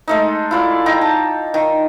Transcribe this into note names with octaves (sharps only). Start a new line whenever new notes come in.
G#3 A3 D#4
E4 F4 D5
D#4 G5 A#5
A5
D#3